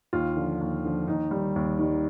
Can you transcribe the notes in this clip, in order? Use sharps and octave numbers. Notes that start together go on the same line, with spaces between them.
D#2 F4
D3 F3
D#2
D3 F3
D#2 D#4
D#3 G3
D#2
D#3 G3